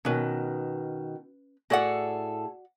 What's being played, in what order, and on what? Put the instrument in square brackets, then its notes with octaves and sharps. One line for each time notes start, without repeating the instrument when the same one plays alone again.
[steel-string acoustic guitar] B2 D#3 [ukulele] C#4 B4
[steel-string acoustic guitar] A2 G#4 A4 [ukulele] F#4 D5 F#5